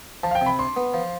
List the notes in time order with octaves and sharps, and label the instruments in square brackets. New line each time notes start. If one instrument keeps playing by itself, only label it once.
[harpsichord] F3 [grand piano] A5
[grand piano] F5
G5
[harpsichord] C3
[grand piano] B5
[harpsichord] D4 [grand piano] C6
[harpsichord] B3
F3